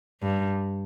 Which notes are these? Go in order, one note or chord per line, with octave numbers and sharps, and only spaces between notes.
G2